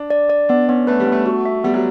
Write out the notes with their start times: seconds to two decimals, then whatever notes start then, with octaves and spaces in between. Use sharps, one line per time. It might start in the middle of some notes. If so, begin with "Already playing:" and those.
Already playing: D4
0.10 D5
0.30 D5
0.49 B3 D4
0.69 B3 C#4
0.87 A3 B4
1.00 G3
1.07 A3 B3
1.26 F#4
1.45 E5
1.64 G3 B3
1.74 F#3